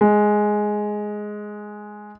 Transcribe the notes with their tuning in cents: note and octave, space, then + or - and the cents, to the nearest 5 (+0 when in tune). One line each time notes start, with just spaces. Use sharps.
G#3 +5